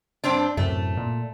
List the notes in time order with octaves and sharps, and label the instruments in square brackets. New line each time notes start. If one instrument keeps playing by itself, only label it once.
[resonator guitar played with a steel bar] G2 C4 D4
[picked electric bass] F#2 A2 C3 [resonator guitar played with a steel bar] A3
[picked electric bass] A#2